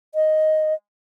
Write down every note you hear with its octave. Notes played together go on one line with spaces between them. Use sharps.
D#5